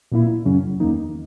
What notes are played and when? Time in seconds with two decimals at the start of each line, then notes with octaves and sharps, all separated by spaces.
0.12 A#2 A#3 E4
0.45 F#2 C#3 F#3 C#4
0.80 E2 D#3 A#3 D#4